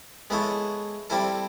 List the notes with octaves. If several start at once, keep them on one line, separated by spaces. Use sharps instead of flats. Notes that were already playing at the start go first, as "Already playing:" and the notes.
G#3 B3 E4 A4 C#5
G3 C4 E4 A4